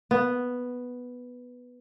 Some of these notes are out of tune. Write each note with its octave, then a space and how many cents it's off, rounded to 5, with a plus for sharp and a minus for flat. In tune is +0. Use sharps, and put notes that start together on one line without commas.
B3 +0